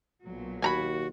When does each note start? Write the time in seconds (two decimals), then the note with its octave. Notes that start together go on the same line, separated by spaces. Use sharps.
0.25 B1 A#2 F#3
0.62 D#2 F#4 G#5 A#5 B5